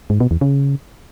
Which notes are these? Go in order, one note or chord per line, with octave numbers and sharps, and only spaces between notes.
G#2
B2
E2
C#3